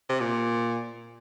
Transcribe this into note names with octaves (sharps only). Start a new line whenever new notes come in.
C3
A#2